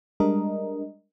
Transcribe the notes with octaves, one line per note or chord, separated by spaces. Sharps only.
G3 G#3 D4 A#4 D#5